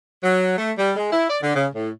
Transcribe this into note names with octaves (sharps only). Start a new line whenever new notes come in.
F#3
A3
G3
G#3
E4
D5
D3
C#3
A2